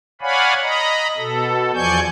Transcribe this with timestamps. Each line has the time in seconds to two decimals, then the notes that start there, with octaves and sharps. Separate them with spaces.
0.21 C#5 D5 F5 F#5 G#5 B5
0.62 D#5 A#5 B5
1.17 B2 A4
1.74 E2 F3 D5 G#5 C#6 G6